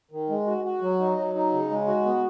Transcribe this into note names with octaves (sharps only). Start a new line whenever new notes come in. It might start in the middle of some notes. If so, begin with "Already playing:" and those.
D#3
G#3
F#4
F#4
F#3
D#4
F#3
D#4
C#3
G#3
F#4
B3